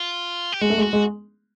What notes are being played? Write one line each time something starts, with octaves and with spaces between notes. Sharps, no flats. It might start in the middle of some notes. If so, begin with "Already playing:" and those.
Already playing: F4
G4
G#3 F#4
A3
G#3
F#4
G#3